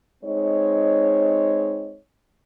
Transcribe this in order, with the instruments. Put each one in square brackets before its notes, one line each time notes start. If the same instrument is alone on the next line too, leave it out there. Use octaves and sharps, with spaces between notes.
[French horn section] G#3 C4 D#4 C#5